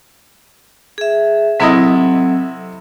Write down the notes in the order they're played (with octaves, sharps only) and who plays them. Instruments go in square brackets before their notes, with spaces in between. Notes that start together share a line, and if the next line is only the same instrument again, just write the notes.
[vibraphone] G#4 E5
[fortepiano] C3 E4 D#5 [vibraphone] F#3 C4 A4